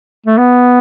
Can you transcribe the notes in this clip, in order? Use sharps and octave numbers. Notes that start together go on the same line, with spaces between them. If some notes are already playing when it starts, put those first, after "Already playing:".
A3
B3